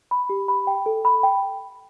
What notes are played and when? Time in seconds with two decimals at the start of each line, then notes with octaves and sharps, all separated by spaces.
0.11 B5
0.29 G4
0.48 B5
0.67 G5
0.86 A4
1.05 B5
1.23 G5